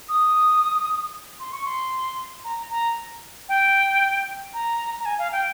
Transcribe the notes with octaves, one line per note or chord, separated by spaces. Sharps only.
D#6
C6
C#6
C6
A#5
A#5
G5
A#5
A#5
G#5
F5
G5